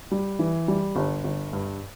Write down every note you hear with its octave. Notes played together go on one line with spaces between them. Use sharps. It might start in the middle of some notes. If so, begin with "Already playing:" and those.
G3
E3
G3
G1
G1
G2